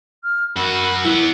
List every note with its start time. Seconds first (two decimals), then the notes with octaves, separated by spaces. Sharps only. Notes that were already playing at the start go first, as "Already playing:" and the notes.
0.24 F6
0.56 F#2 F#4 A#4 B5 E6
1.05 E3 B3 E4